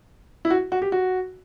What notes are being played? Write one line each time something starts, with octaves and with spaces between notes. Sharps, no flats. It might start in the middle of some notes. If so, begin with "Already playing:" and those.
E4
F#4
F#4
G4
F#4